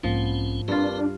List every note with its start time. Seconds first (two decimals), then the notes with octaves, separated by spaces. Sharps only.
0.03 B1 G#2 F3 A#3 C4 C#4
0.68 G2 C4 D4 F4 A#4 B4